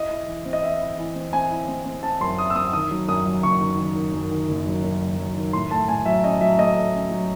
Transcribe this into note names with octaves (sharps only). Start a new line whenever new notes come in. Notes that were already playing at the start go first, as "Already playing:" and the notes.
Already playing: E4 D#5
E4
E3
C4
D#5
E4 E5
E4
E3
C4
C4 G#5
E4
C4
C4
C4 A5
F#2 C6
E4 D#6
E6
C4 D#6
D#3 D#6
F#3
F#2 D#6
F#3
F#1 C#6
D#3
D#3
D#3
F#2
D#3
F#1
F#3
F#2
F#1
F#3
D#3
A2 C6
A3 A5
A2 G#5
F#3 E5
C#4 D#5
F#3 E5
A3 D#5
A3
C#4
F#3